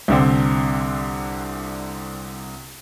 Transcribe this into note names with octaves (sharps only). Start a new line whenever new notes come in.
C2 D3 C4